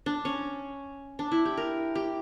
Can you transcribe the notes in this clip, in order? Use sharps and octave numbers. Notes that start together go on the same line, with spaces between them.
D4
C#4
D4
E4
G4
A#4
G4